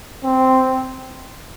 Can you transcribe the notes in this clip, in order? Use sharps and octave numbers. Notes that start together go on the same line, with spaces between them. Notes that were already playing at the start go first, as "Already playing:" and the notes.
C4